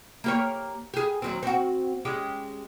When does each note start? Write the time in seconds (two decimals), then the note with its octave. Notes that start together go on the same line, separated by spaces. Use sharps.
0.24 A#3 G4 C#5
0.94 G4 G#4
1.22 D#2 F#3 C4
1.43 C4 F#4
2.05 G#3 C#4 G4